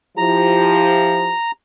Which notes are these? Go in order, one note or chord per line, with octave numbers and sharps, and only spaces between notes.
F3 E4 G4 A#5